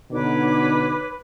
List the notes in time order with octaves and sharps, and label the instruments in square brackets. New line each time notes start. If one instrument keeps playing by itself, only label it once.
[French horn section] B2 D3 D#4 [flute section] B4 C#5 D6